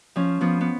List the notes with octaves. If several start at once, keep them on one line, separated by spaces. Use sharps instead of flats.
F3 C#4
F3 B3
B3